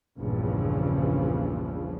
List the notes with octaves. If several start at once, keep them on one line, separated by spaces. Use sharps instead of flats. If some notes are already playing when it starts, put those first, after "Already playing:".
A#1 E2 G2 C#3 E3 F3